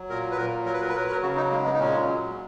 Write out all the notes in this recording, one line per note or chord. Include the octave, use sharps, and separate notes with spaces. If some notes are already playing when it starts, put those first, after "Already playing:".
Already playing: F#3
A#2 A#4
B4
A#2 A#4
F#3 A#4
B4
A#4
B4
F#3 A#4
B4
A#4
C#3 F#4
D#4
G#3 A#3
B3
D#4
A#2 C#4
F#3